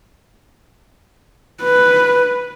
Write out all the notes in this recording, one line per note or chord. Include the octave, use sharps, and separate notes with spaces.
B4